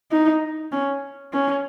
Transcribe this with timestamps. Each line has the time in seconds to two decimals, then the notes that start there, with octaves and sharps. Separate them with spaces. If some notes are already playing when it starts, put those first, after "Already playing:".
0.11 D#4
0.72 C#4
1.33 C#4